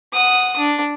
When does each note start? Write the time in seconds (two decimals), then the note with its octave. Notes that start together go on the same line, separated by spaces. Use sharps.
0.13 F#5 D#6
0.58 D4